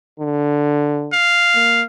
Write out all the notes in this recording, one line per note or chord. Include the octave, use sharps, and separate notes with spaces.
D3
F5
A#3